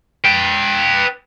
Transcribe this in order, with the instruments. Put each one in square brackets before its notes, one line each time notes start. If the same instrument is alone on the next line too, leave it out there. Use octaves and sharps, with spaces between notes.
[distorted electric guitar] B4 G5